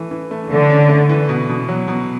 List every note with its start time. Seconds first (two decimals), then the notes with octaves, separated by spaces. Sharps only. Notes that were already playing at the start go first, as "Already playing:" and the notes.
Already playing: E3 A3
0.11 E3
0.31 A3
0.50 D3 A3
0.70 C#4
0.89 A3
1.09 E3
1.29 B2
1.49 B2
1.69 F#3
1.88 B2